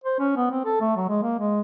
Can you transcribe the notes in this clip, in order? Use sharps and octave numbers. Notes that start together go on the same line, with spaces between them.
C5
C#4
B3
C4
A4
A3
F#3
G#3
A#3
G#3